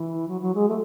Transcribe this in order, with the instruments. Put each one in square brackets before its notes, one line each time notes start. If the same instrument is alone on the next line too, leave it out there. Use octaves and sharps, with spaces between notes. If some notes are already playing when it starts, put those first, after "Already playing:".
Already playing: [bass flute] E3
F#3
F#3
G#3
A3